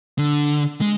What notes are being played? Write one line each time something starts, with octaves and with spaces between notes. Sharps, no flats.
D3
G#3